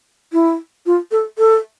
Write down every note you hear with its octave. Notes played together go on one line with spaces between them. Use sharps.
E4
F4
A4
A4